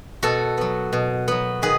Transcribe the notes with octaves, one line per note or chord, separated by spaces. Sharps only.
B2 F#4 A4
F#3 B3
B2
F#3 B3
D#3 G#4 B4